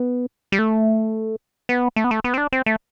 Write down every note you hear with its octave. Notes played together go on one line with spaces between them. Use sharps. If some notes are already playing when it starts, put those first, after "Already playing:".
Already playing: B3
G3
A3
B3
A3
B3
A3
B3
C4
D4
C4
A3